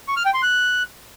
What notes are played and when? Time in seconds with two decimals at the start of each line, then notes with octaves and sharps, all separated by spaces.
0.08 C#6
0.17 F6
0.25 G5
0.34 C6
0.42 F#6